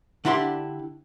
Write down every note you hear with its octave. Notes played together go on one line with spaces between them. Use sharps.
D3 D4 E4 G4 A#5 C6